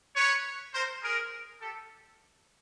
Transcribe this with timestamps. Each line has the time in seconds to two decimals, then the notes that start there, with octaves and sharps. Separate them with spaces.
0.15 B4 C#5
0.73 A#4 C5
1.02 G#4 A#4
1.61 G4 A4